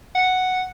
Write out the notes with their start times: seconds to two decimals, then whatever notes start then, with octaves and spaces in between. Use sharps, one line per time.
0.15 F#5